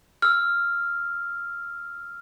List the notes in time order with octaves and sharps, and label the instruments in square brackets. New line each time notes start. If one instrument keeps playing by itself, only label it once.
[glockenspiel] E6 F6